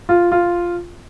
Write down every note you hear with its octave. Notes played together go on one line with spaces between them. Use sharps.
F4
F4